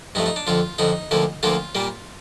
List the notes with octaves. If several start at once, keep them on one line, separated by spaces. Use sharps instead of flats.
G2 F3 A3 D#4
D#4
D4
F2 D3 F3 F4
F2 D3 F3 D#4
D2 D3 F3 A#3
D2 D3 F3 A#3 F4
A#2 G3 A#3